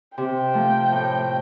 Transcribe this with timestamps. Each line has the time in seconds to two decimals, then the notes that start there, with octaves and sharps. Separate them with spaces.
0.17 C3 G5
0.54 F3 A3
0.92 A2